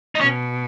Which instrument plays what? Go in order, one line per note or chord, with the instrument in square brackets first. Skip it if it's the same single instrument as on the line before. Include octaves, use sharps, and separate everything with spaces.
[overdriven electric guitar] D#4
[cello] B2 [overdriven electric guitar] C#4